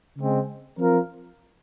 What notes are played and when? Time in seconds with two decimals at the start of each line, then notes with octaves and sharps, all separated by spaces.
0.17 C#3 G#3 C4
0.77 F3 C4 F4 A#4